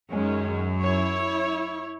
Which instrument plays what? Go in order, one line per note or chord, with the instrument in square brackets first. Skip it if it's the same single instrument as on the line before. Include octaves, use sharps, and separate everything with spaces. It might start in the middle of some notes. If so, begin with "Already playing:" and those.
[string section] F#2 [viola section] D#3 G#3 C#4
[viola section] E4 C#5